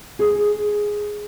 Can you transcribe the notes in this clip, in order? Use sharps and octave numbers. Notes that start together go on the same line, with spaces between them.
G#4